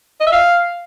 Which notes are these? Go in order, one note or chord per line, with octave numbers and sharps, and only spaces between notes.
D#5
E5
F5